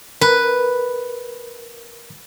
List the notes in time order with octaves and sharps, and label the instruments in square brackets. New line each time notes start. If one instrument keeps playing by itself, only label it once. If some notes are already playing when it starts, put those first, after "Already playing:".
[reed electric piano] A#4 [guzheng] B4